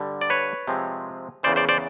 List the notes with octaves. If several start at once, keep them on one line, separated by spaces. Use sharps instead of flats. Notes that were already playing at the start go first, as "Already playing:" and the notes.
Already playing: G2 D3 G3
D5
B4 C#5
C3 F3 G#3 C4
E2 C#3 E3 C5 D5
C5 D5
C5 D5